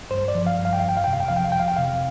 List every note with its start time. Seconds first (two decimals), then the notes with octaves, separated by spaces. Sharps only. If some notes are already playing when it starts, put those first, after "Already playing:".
0.11 G2 C5
0.28 D5
0.35 F3
0.47 F5
0.59 G2
0.65 F5
0.73 G5
0.80 F2 F5
0.89 G5
0.97 F5
1.04 C3 G5
1.13 F5
1.20 G5
1.28 F3 F5
1.36 G5
1.44 F5
1.52 F2 G5
1.60 F5
1.68 G5
1.76 C3 F5